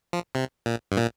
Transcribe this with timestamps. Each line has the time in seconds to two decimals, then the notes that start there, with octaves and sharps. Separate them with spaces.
0.13 F3
0.35 C3
0.66 A#2
0.92 G2
0.97 A#2